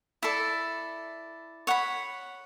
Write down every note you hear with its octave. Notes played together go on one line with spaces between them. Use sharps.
E4 A4 D5
C#5 F#5 B5